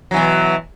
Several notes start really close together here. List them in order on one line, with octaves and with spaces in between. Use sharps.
F#3 E3 B2